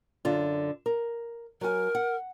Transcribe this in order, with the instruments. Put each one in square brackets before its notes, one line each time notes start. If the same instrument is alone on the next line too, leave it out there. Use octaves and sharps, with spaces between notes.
[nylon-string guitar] F#2 D3 F4
A#4
[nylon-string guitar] F#3 G#5 [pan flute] A#4
[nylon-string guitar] F#5